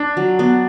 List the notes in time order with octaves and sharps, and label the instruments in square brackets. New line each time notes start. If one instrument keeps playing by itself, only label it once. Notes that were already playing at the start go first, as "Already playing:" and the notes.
Already playing: [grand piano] D4
[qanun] F#3
B3